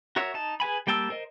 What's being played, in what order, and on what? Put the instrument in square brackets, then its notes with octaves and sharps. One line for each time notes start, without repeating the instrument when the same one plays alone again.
[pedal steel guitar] F#4 A#4 C#5 E5
D#4 A5
G#4 B4 G#5 B5
G3 A#3 G5 A5 E6
A#4 C5 D#5